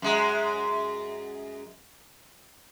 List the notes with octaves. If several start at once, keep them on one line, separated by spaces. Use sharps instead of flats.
F#2 G#3